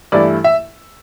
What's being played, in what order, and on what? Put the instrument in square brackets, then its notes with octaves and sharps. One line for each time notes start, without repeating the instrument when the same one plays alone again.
[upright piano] G2 E3 A3 E4 D5
E5